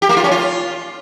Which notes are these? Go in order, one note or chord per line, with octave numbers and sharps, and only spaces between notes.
G4
A#3
F4
C#4
F4